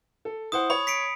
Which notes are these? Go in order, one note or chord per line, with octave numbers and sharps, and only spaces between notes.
A4
E4 C5 F#5 D#6
C#5 B5
B6 C#7 D7